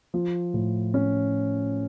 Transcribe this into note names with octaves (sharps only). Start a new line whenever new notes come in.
F3
A2
C#4